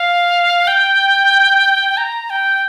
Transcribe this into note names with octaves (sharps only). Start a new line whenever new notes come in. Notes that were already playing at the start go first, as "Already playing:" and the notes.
Already playing: F5
G5
A#5
G5